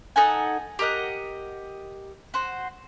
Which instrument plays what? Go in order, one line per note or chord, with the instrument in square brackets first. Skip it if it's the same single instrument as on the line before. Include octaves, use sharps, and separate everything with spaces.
[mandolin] D#4 A4 F#5 G#5
G4 A#4 D#5 F#5
F#4 C5